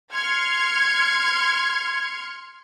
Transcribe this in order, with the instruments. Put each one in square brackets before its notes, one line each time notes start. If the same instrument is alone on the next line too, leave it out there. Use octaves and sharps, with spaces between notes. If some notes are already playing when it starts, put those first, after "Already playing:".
[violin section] C6 F6 G#6 C#7